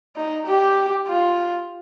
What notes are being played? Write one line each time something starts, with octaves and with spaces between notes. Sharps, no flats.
D#4
G4
F4